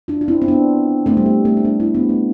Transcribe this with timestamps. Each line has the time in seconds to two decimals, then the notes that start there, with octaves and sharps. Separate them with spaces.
0.08 D4 F4
0.21 F4
0.28 C4 E4
0.42 C4
0.48 B3 D4
1.06 A3 C4
1.17 G3
1.26 A3
1.45 A3
1.57 D4
1.65 A3 C4
1.80 C4 E4
1.95 B3 D4
2.09 A3 C4